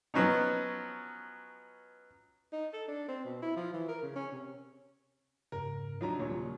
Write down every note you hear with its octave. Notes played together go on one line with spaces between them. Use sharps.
F3 F#3 B3 C#4 D#4
D#4
A4
D4
C4
B2
E4
F3
E3
A#4
C#3
C#4
C3
F2 G#2 C#3 A#4
F3 F#3 D4 D#4 A#5
D#1 A#2 C#5
C#3 F3 G3